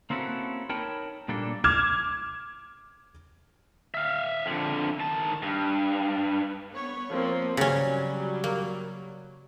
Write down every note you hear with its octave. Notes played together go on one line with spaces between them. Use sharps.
A#3 C4 C#4 E4 F#4 A4
D#4 A#4 C#5 G5 A5 B5
A#2 G3 A#3 D4 A4
D6 F6 G#6 E7
E5 F5
F2 D3
D#3 A5
G2
B3 C#5
F3 A#3 C4
C#3 F#3 G3 C#4
A#3